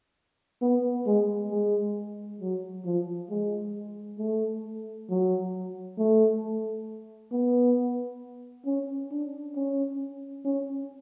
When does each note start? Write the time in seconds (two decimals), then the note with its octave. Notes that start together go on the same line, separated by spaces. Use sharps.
0.62 B3
1.06 G#3
1.51 G#3
2.41 F#3
2.85 F3
3.30 G#3
4.19 A3
5.09 F#3
5.98 A3
7.32 B3
8.65 C#4
9.11 D4
9.56 C#4
10.45 C#4